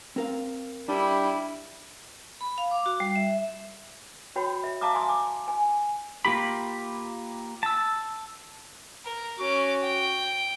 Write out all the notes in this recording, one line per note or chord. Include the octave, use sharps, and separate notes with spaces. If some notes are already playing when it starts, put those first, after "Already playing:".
C4 A#4 F5
G3 D4 E4
B5
F5
D6
F#4
G3
E5
F#4 C#5 G5 B5
E5
E5 F5 A5 A#5 D6 D#6
G#5 C6 D#6
D6
G#5
A#3 F4 G4 B5
A5 E6
A#4
C#4 F#4 D6
G5